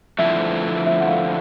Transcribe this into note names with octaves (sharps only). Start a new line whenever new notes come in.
D3 F3 A3 C4 E4 E5
E5
F#5
F5